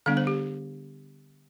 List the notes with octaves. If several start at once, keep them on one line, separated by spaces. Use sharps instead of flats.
D3 G3 B3 D4 F5
C5
G4